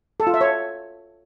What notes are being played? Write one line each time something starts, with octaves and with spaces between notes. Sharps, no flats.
A4
F4
E5
C#5